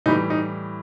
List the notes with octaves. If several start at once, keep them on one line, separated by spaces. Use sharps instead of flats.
A2 E3 G3 D#4
D#4